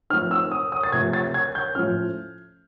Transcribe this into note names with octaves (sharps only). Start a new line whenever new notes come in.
F3 A3 C4 D#4 F6
E6
D#6
D#6
A6
C3 F3 A3 G#6
A6
G#6
G6
A2 F3 A3 C#4 F4 F6